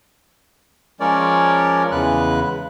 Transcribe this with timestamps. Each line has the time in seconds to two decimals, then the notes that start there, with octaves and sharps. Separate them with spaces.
1.00 F3 G#3 C#4 A#4 C#5 D5
1.92 E2 C#3 G#3 B4 F#6